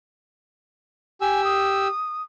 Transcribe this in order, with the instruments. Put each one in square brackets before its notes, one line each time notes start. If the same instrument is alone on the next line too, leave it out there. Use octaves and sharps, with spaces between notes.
[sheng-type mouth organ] G4 E6 [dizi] G#5
[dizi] D#6